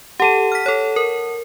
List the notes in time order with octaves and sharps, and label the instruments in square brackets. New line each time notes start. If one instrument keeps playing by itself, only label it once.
[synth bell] G4 A4 [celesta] F#5 A5 D#7
[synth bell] F6 B6
A4 C#5
A#4